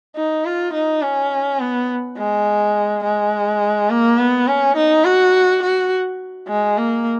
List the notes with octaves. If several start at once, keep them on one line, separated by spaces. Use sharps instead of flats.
D#4
F4
D#4
C#4
B3
G#3
G#3
A#3
B3
C#4
D#4
F#4
F#4
G#3
A#3